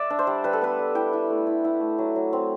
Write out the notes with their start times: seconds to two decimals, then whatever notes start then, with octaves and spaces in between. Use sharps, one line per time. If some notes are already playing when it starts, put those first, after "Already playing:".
Already playing: D5 E5 F#5
0.10 D4
0.19 C5
0.27 G3
0.44 G3 B4
0.53 A4
0.62 B3 B4
0.79 G3
0.95 E4 G5
1.13 E4
1.30 A3
1.47 E4
1.64 E4
1.80 A3
1.98 F#3
2.16 F#3
2.33 C4